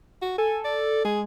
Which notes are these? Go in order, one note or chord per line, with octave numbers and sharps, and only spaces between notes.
F#4
A4 G#5
D5
G#3 G#4